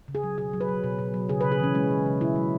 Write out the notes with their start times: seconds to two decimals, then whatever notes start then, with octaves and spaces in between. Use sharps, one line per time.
0.08 C#3
0.15 G#4
0.23 F#3
0.38 B2 G#4
0.53 F#3
0.61 B4
0.69 F#3
0.84 B2
0.99 B2
1.14 F#3
1.29 C#3 G#4
1.41 C#3 B4
1.52 G#4
1.60 E3 C#4
1.75 G#3 C#4
1.90 C#3
2.06 C#3
2.21 B2 E4
2.36 F#3